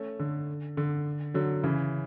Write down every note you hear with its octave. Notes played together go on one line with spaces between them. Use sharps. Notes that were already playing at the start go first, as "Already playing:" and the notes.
Already playing: A3 C#4
D3
D3
D3 F#3
C#3 E3